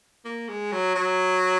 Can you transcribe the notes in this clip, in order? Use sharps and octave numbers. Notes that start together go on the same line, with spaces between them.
A#3
G#3
F#3
F#3